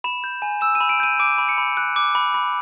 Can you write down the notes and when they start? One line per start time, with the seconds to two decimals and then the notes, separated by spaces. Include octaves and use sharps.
0.04 B5 E7
0.24 G6
0.42 G#5
0.61 E6 E7
0.75 D#7
0.81 B5
0.89 D7
1.00 G6 D#7
1.20 D6 D7
1.38 B5
1.49 C#7
1.58 B5
1.77 F#6
1.96 D6
2.15 B5
2.34 B5